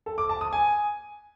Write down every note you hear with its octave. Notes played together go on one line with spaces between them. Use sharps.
A4
D6
A5
D#6
G#5